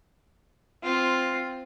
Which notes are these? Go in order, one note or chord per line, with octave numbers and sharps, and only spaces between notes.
C4 F4